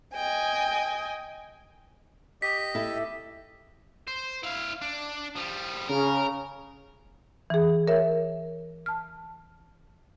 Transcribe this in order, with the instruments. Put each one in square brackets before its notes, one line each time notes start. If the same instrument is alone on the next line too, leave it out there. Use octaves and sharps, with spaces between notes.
[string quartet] D#5 G5 G#5
[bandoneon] G4 D#5 [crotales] B6
[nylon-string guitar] E4 A4
[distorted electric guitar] C5
E4 F5
D4
F3 G3
[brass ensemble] C#3 [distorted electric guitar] A#4
[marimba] E3 G#4
A#4 C#5 E5
A5 F6